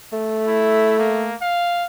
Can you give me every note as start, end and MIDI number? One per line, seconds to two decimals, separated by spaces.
0.13 1.35 57
0.48 0.98 64
0.99 1.35 58
1.41 1.86 77